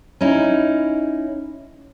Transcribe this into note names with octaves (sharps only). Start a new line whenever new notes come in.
C#4 D#4 E4